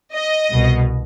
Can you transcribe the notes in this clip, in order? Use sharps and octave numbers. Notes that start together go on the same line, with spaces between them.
D#5
C2 B2